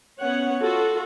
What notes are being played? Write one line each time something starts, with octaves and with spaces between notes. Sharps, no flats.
B3 C#4 C#5 F#5
F4 F#4 A4